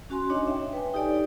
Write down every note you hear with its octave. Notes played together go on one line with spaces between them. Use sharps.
C#4 F#4 G#5 C6
D4 D#4 C#5 D#5
E5 G5
B4 G5 G#5
D#4 G4 A4 C#5 D5